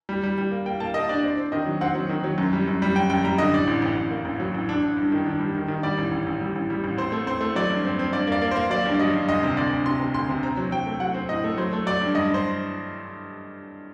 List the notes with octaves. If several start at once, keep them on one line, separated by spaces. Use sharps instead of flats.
G3
G3
G3
A#3
A#3 G5
A#3 A5
A#3 D#5
D4 D5
C4 D5
C4
D#3 D#5
F#3
C4 F#5
F#3
D#3
F#3
F#2
G3
F#2
G3
F#2 G5
F#2 G5
G3 A#5
D3 D#5
A1 D5
A1
A1
A1
A#3
A1
F#3
A1
D4
D4
G2
D#3
D4
G3
D#3
D#3
G3 D5
A1
A1
A1
G3
A1
G3
A1
C4 C5
A3
C4 C5
A3
F#3 D5
G2
C4
C4
G2 D5
A#3 D5
A#3
C5
A#3
F#3 D5
G2
D5
F#3 D#5
G2
D2 D#5
C3
D2 D5
D2
C3 C6
C3
D2 C6
C3
C4 A#5
F#3
F#3 G5
A3
F#3 F#5
C4
A2 D#5
A3
F#3 C5
A3
F#3 D5
G2
G2 D#5
G2 C5